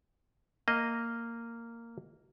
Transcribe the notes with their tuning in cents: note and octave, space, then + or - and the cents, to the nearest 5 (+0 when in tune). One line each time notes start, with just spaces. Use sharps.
A#3 -10 D#5 +0